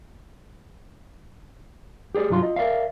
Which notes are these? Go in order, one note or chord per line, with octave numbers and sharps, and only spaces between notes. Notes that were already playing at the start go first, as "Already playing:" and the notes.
G4 G#4 C#5 D5
C2 G2 F#3 F4 F5 C6
F4 D#5
A#4 D5 E5 F5